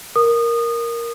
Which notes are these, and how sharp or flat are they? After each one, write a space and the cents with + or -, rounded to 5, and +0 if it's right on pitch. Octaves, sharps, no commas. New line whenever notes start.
A#4 +0 D#6 -25